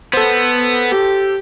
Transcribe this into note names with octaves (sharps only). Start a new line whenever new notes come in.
B3 A4 C5
G4